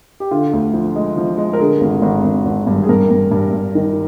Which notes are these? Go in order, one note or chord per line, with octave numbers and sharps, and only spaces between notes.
G4
D3 F4
D2
F3
G#3
F3
G#3
A#4
D3 G#4
G#1
G#1
G#1
G#1
G2
G#4
G2 A#4
G2
G2
G2
D#3